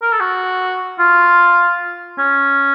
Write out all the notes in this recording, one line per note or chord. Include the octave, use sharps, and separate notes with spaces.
A#4
A4
F#4
F4
C#4